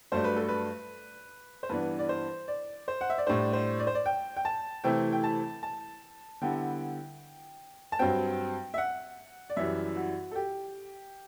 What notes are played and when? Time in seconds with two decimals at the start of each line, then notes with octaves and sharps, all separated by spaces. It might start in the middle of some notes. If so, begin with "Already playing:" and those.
0.12 G2 F#3 A3 D4 C5
0.24 B4
0.36 A4
0.49 B4
1.63 C5
1.69 G2 E3 B3 D4 B4
1.99 D5
2.09 C5
2.48 D5
2.88 C5
3.01 F#5
3.10 E5
3.18 D5
3.26 A2 G3 D4 C5
3.53 C5
3.79 D5
3.87 C5
3.95 D5
4.06 G5
4.36 G5
4.45 A5
4.84 C3 E3 A3 C4 E4 G5
5.13 G5
5.24 A5
5.63 A5
6.42 D3 G3 B3 E4 G5
7.92 A5
7.99 G2 F#3 C4 G5
8.74 E5
8.78 F#5
9.50 D5
9.57 F#2 E3 G3 E5
9.96 F#4
10.32 A4
10.35 G4